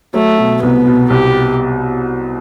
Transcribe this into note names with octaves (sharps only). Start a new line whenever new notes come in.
F#3 A3
B2
C2 B3
B2
C2 G4